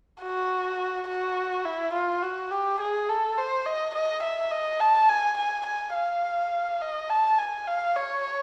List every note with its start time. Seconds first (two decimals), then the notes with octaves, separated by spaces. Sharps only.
0.22 F#4
1.08 F#4
1.65 E4
1.93 F4
2.23 F#4
2.51 G4
2.80 G#4
3.09 A4
3.38 C5
3.66 D#5
3.95 D#5
4.23 E5
4.51 D#5
4.80 A5
5.08 G#5
5.37 G#5
5.66 G#5
5.95 F5
6.82 D#5
7.10 A5
7.38 G#5
7.67 F5
7.96 C#5